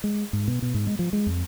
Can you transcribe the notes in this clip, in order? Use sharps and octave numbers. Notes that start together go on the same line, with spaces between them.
G#3
G#2
B2
B2
G#2
G#3
F3
G#3
F2